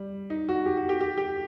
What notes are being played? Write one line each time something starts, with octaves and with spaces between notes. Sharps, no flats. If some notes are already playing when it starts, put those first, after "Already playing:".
Already playing: G3
D#4
F#4
G4
F#4
G4
G4
G4